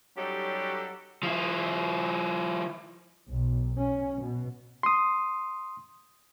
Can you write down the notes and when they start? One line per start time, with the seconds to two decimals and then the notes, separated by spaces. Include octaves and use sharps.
0.17 F#3 G3 C#4 D#4 G4 A4
1.23 F3 E4
3.30 B1
3.79 C#4
4.20 B2
4.83 C6 D#6